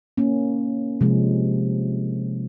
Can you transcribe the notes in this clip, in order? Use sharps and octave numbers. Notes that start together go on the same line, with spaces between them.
A#3 C#4
C3 F3 G#3